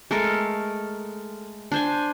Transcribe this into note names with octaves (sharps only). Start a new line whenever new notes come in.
G#3 A3 A4 A#4
D4 C5 G#5